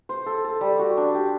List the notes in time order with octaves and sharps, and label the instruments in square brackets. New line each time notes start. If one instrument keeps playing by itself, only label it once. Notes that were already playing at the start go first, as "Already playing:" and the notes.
[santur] C5
A4
A4
G3
F#4
D4
G4